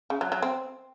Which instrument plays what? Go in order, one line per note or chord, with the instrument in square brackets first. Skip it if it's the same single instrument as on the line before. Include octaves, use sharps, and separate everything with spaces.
[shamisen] C#3
F#3
F#3
C4